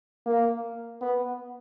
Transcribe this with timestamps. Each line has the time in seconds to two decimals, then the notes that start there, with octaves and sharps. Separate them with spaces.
0.26 A#3
1.01 B3